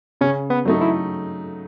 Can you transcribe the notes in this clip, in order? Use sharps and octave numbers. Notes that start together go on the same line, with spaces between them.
C#3 C#4
B3
F#3 A3 D#4
E3